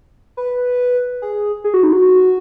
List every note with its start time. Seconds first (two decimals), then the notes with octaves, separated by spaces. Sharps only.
0.37 B4
1.22 G#4
1.64 G#4
1.74 F#4
1.83 D#4
1.93 F#4